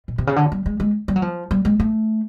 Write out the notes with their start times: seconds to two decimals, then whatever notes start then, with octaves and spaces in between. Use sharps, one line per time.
0.08 B2
0.18 C3
0.27 C#3
0.36 D3
0.52 G3
0.66 G#3
0.80 G#3
1.08 G3
1.16 F#3
1.22 F3
1.51 G3
1.65 G#3
1.80 A3